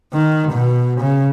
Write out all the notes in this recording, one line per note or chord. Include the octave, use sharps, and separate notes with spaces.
D#3
B2
C#3